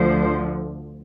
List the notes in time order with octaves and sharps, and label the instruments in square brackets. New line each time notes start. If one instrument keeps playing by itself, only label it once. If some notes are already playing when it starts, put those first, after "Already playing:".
Already playing: [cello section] D2 D3 F3 C5